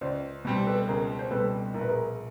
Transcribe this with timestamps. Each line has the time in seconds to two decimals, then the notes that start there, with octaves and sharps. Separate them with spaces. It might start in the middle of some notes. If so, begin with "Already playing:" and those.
0.01 C#2 C5 D5
0.45 B2 G3 C4
0.66 A4 B4
0.88 C#2 G#4 A#4
1.19 C5
1.31 B2 G3 C4 A4 B4
1.74 A#1 A#4
1.81 B4
1.88 G#4 A#4